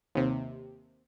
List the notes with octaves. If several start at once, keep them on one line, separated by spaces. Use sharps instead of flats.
D#2 C3